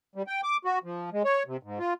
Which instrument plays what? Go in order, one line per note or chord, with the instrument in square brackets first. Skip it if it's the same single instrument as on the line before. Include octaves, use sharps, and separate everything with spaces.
[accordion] G3
G5
D6
F#4
F3
G#3
C#5
C3
G#2
F4